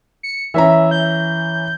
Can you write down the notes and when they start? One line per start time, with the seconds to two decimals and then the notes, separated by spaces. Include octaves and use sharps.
0.23 C#7
0.54 E3 C#4 E5 A#5
0.91 G6